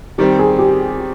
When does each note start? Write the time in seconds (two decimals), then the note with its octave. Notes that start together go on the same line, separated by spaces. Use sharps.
0.18 D#3 G3 C4 G4
0.39 G#4
0.58 G4